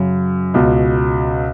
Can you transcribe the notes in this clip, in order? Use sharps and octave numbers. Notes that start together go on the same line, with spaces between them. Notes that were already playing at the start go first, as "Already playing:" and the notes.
Already playing: F#2 C#3
C#2 B2